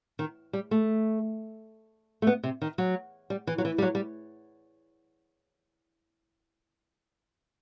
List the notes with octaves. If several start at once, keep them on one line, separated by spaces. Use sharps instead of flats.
D#3
G3
A3
A3
B3
C3
D#3
F#3
G3
E3
F#3
E3
G3
F#3
G3